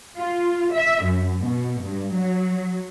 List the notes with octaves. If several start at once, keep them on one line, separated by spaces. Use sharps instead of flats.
F4
E5
F#2
B2
G2
F#3